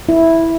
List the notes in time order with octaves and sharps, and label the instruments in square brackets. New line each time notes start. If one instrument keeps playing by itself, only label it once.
[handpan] E4